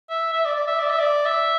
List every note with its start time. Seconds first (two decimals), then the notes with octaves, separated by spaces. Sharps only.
0.10 E5
0.33 E5
0.45 D5
0.56 D5
0.67 E5
0.79 D5
0.90 E5
0.99 D5
1.26 E5